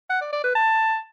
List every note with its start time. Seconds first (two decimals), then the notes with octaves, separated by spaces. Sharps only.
0.10 F#5
0.21 D5
0.33 D5
0.44 B4
0.55 A5